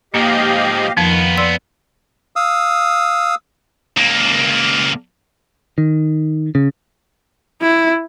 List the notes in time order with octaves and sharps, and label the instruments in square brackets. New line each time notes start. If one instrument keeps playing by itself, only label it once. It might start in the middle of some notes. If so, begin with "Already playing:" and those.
[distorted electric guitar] G#2 F3 [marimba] A#3 [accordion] G4 D#5 F5
[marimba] F2 F3 [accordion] D#3 [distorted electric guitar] B3 F4
[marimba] D5 C6 E6
[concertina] F5 D#6 E6
[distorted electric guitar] C#2 A#3
[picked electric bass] D#3
C#3
[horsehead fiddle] E4